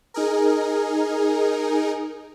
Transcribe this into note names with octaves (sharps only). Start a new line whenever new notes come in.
D#4 G#4 A#4